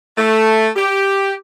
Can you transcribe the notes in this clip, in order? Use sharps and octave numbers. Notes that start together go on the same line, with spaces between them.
A3
G4